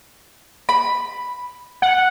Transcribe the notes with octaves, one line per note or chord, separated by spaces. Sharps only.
B5
F#5